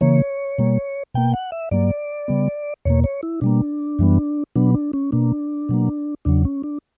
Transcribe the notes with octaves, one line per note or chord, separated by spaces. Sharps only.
C#3 E3 A#3 C#5
B2 G3 A#3
B2 A#3 G5
F#5
E5
G2 F#3 A#3 D5
C#3 G3 B3
E2 B2 A#3 C#5
C#5
E4
B2 G3 A#3 D4
F#2 E3 G3 B3
B2 F#3 B3 D4
D4
C#4
B2 A#3 D4
B2 F#3 A#3
E2 C#3 F#3 D4
C#4
D4